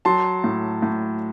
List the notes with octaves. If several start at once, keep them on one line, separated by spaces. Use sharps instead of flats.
F#3 A5 C6
A2
A2